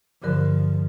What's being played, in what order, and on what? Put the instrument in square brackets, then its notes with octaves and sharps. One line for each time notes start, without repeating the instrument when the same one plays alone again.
[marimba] G2 D3 A#4 [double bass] F3